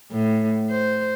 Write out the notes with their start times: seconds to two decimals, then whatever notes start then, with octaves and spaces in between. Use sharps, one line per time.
0.11 A2
0.70 C5